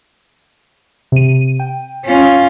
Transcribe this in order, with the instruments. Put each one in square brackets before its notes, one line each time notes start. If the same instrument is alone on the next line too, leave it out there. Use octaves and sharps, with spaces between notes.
[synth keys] C3 D#7
G5
[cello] C#4 F4